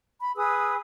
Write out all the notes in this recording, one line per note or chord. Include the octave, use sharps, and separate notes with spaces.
B5
G#4 B4 D#6 E6